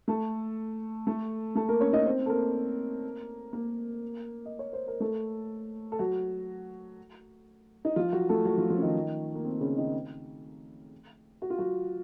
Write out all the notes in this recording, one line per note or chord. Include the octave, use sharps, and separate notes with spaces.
A3 A4
A3 A4
A3 A4
A#3 A#4
C#4 C#5
D#4 D#5
C4 C5
A4
A#3 A#4
A#3 A#4
D#5
C#5
C5
A#4
A3 A4
A4
F#3 F#4
D#4
F3 F4
F#3 F#4
A3 A4
F#3 F#4
F3 F4
F3 F4
C#4
D#3 D#4
A#3
C4
C#3 C#4
D#3 D#4
F#4
F4
F#3 F#4